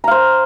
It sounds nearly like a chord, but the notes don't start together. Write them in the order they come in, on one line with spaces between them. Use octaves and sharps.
A#5 F5 C5